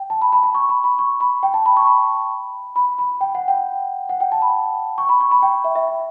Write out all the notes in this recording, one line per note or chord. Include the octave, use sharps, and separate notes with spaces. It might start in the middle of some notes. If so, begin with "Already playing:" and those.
Already playing: G5
A5
B5
B5
B5
C#6
B5
B5
C#6
B5
G5
A5
B5
C#6
B5
B5
B5
G5
F#5
G5
F#5
G5
A5
B5
C#6
B5
C#6
B5
G5
E5
E5